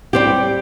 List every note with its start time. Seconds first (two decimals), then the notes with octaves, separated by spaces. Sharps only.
0.13 G3 C4 G4